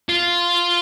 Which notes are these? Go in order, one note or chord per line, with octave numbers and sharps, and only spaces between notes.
F4